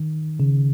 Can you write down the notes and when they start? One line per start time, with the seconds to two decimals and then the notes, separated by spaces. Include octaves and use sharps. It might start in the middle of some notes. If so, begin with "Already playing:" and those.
Already playing: D#3
0.40 C#3